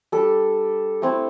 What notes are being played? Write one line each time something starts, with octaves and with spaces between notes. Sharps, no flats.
G3 D4 A4
A3 C4 E4